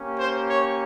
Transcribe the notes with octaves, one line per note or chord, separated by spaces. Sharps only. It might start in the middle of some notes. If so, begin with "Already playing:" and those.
Already playing: A#3 C#4 G4
C5
C#5